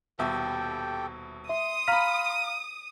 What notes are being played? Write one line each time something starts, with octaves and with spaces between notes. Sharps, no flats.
D#1 B2 G4 A4 E5 G5
E5 C6 D#6
F5 A#5 B5 F6 B6